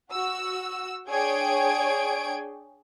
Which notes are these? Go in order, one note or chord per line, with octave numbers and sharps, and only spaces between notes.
F#4 E6
D4 G#4 C#5 G5 G#6 D7